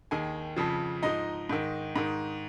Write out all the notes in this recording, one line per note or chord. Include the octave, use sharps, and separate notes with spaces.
D#2 D#3 G#4 G#5
F2 C#3 F3
G#2 F3 D#4 D#5
G#2 D#3
G#2 D#3